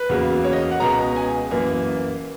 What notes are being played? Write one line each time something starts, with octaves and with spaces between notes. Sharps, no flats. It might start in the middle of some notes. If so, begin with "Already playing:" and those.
Already playing: B4
E2 C#3 F#3 A#3
C#5
D#5
F#5
C#2 B2 G#3 B3 A#5
G#5
F#2 E3 A#3